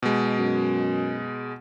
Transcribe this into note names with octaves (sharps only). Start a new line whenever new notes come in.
B2 G#3
F#2